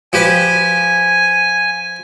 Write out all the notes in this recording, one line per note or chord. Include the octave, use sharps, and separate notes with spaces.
F3 G4 B4 G#5